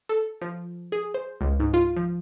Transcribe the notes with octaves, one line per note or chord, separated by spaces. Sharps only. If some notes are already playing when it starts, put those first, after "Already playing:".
A4
F3
G#4
C5
C#2
G#2
F4
F3